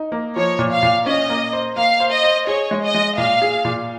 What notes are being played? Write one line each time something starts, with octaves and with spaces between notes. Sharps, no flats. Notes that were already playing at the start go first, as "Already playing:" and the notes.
Already playing: D#4
A#3
F3 C#5
A#2
F5
A#2
C#4 D#5
A#3
C5
A#3 F5
C5
D#5
C5
G#4 C#5
G#3
D#5
G#3
A#2 F5
G#4
A#2